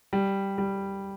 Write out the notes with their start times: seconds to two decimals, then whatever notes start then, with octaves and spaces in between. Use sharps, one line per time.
0.13 G3
0.58 G3